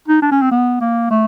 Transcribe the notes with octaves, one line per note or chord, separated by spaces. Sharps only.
D#4
D4
C#4
C4
B3
A#3
A3